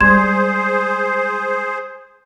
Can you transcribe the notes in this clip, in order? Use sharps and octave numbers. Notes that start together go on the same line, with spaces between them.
G3 G#3 G#4 C5 C6 G#6 E7